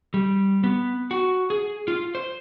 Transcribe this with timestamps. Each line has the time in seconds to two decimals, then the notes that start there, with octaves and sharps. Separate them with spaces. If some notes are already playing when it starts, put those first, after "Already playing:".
0.14 G3
0.64 B3
1.11 F#4
1.50 G#4
1.88 F4
2.15 C5